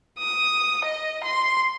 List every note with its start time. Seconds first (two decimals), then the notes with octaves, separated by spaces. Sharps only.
0.19 D#6
0.85 D#5
1.24 C6